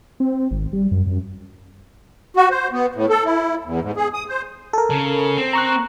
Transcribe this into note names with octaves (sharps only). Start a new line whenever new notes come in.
C4
G#1
G3
F#2
F#2
F#4
C5
B3
A2
A4
E4
E2
G#2
G#4
D#6
C5
A4 A#4
C#3
C4
A#5 C#6 F#6